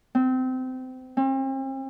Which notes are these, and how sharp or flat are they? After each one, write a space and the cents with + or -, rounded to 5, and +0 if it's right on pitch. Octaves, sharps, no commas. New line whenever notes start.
C4 -25
C4 +40